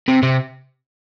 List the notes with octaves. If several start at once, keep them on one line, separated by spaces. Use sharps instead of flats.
C3
C3